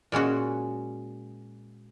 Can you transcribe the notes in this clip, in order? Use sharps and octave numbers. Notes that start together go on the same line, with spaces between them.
A#2 G#3 C#4 F#4